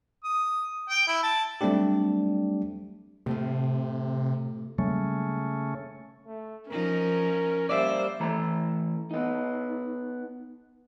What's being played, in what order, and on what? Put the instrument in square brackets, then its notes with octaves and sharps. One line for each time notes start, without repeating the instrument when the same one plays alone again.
[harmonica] D#6
G5
E4
A5
[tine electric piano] F#3 G3 A3 C4 D4 G4
[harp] A2 A3 F4 [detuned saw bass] C3
[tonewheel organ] C#3 A3 C#4 [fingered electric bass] F#3 G3 A#3
[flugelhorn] A3
[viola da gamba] F3 D#4 [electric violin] C#4 [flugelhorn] A#4
[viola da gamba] G3 C5 [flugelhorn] A#3 [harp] D5 E5
[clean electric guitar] E3 A3 A#5
B3 D#4